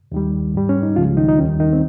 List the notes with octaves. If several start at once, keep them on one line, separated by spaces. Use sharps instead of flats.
D#2 D#3 G3
G#2 G3
C#4
D#4
C#2 C#3 F3 G#3 F4
D#3 D#4
D#4
D#2 D#3 G3 C#4
D#3 D#4
C4